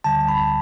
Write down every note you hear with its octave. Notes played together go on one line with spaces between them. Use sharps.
D2 D3 G3 A5
B5